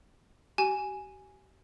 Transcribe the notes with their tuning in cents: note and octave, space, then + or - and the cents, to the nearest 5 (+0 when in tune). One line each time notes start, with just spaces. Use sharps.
G4 -40 G#5 +0